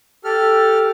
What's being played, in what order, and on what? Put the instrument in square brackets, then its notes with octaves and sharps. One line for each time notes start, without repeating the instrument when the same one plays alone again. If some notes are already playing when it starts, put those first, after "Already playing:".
[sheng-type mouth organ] G4 A4 F6